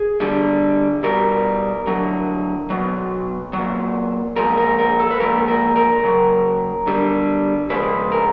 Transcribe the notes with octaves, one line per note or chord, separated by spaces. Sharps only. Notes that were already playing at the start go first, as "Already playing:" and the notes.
Already playing: G#4
D3 G3
B2 G3 A#4
D3 F#3
B2 F#3
A#2 F#3
A#2 F3 G#3 A#4
A#4
A#4
A4
B4
A#2 F3 G#3 A#4
A#4
A#4
C#3 F#3
D3 G3
C#3 F3 G#3 B4
A#4